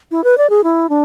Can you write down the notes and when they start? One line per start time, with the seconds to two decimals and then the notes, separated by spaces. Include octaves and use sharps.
0.11 E4
0.24 B4
0.38 D5
0.50 G#4
0.64 E4
0.89 D4